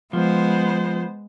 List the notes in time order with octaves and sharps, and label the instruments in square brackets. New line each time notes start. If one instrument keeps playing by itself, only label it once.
[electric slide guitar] F3 [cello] G#3 [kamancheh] B3 C5